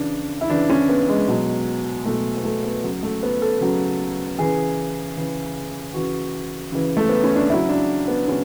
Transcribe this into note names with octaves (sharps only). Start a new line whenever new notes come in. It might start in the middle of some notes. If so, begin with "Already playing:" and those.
Already playing: C#3 E3 D4
E4
C#3 E3 D4
C#4
B3
G#3
B2 F#3
B2 F#3 A3
B3
A3
B3
C#3 F#3
A3
B3
A4
C#3 F#3
C#3 E3 G#4
C#3 E3
C#3 E3 F#4
C#3 E3
A3
B3
C#4
D4
C#3 F#3 E4
D4
B3
C#3 F#3 C#4